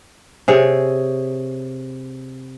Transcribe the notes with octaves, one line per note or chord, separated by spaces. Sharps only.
C3 G#4 C#5